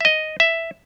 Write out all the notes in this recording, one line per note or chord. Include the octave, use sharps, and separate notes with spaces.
E5
D#5
E5